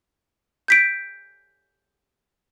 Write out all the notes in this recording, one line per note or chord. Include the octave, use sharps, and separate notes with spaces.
G6 B6 D7